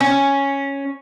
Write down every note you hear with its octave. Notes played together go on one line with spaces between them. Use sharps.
C#4